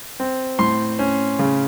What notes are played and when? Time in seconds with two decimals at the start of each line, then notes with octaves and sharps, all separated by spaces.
0.20 C4
0.59 A2 C6
0.99 C#4
1.39 C#3